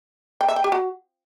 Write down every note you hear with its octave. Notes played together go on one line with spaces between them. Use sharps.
G5
E5
G5
G4
F#4